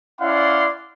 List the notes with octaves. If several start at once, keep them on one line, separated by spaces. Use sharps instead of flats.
C#4 E4 D5 F5 F#5 C6